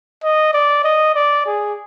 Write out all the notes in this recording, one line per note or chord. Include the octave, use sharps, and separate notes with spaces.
D#5
D5
D#5
D5
G#4